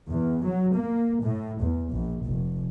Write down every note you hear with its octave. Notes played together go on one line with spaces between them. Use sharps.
E2
F#3
A#3
A2
E2
A#1
F1